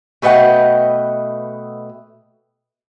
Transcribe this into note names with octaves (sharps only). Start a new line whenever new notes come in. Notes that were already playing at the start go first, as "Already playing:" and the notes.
B2 A3 B4 D#5 F#5 G5